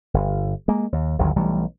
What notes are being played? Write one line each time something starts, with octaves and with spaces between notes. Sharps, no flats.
G1
G#3 A#3
D#2
G1 D2 D#3 F#3
B1 E3 G3 A3